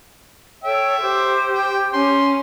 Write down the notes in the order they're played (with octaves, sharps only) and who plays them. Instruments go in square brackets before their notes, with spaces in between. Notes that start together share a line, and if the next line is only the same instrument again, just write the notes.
[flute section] A4 C#5 G5 [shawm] E5
[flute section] G4 [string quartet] C5
[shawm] G5
[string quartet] C#4 [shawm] C6